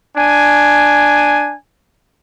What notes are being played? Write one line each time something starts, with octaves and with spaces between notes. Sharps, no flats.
D4 G#5